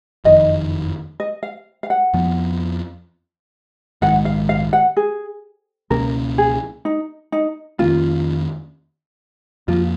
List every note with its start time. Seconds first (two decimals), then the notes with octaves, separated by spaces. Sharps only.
0.24 F#1 F2 D#3 D#5
1.20 D#5
1.43 F5
1.83 F5
1.90 F#5
2.14 F2 F3 B3
4.02 A#1 G#2 D#3 G#3 F#5
4.25 F5
4.49 F5
4.73 F#5
4.97 G#4
5.90 C#2 B2 A#3 C#4 A#4
6.38 G#4
6.85 D#4
7.32 D#4
7.79 F2 D#3 A#3 C#4 F4
9.68 F2 F3 A#3 F4